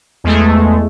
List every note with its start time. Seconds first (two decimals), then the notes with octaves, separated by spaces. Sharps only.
0.24 E2 G#3 A3